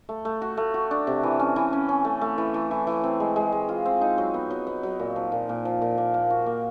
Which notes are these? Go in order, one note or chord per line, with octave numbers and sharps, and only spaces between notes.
A3
A3
F#4
A3
F#4
D4
C3
E3
C#4
E3
C#4
C#4
A3
A3
E3
E3
E3
E3
C4
G#3
G#3
G#3
F4
C4
D#4
F#3
B3
F#3
B3
F#3
A#2
F3
A#2
A#2
F3
A#2
A#3
A#3
F#4
A#3